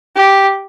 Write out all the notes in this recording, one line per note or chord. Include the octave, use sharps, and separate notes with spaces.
G4